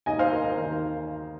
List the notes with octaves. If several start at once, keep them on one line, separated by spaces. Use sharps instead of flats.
D#2 D#3 D#5 G#5
C5 F5
A#4 D#5
A#4
D#2 D#3